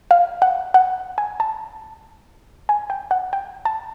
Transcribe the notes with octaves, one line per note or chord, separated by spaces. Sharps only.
F5
F#5
F#5
G#5
A5
G#5
G5
F#5
G5
A5